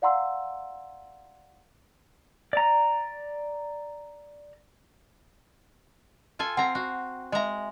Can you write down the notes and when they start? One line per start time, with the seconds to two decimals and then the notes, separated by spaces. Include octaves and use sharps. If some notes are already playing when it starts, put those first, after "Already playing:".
0.02 D5 F5 F#5 A#5 C6 E6
2.53 D5 A#5
6.39 F4 A4 G#5
6.57 C4 F#5 A#5
6.75 F#4
7.32 G#3 D#5 E5 A#5